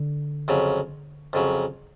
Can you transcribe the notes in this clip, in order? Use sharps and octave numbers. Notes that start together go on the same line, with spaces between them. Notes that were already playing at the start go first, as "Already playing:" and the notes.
Already playing: D3
F2 C#3 F#3
F2 C#3 F#3